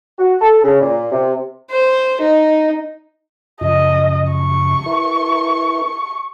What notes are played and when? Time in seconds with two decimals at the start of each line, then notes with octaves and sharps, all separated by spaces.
0.18 F#4
0.40 A4
0.63 C#3
0.81 A#2
1.12 C3
1.71 C5
2.20 D#4
3.61 F#2 C#3 F3 D#5
4.31 C#6
4.86 E4 A#4 B4